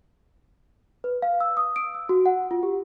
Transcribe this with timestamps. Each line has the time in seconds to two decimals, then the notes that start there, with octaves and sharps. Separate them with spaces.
1.04 B4
1.22 F5
1.41 E6
1.57 D#6
1.76 D7
1.94 E6
2.09 F#4
2.26 F#5
2.51 F4
2.63 G4